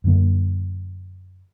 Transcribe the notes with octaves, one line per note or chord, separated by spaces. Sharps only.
F#2 D3 A#3